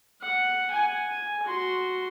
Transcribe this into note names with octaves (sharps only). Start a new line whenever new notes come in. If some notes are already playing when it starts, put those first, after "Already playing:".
F#5
F#5 G#5
G#5
F#4 C6